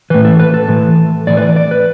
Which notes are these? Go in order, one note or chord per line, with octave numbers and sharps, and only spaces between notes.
A2 E3 B4
A4
B4
A4
A2 E3
A2 E3 D5
B4
D5
D5
B4